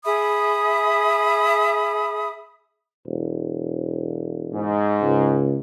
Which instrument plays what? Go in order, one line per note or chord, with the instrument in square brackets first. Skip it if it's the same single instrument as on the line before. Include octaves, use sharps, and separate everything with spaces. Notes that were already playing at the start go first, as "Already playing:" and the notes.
[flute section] G#4 E5 B5 D#6
[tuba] E1
[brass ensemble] G#2
[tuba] C#2